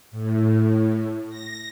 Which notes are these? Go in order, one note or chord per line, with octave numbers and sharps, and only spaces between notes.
A2
A#6